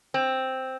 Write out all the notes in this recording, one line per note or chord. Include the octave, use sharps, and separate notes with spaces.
C4